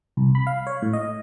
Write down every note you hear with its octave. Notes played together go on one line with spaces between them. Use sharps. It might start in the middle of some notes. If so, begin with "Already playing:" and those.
C2
B5
F5
C#5
A2
D#5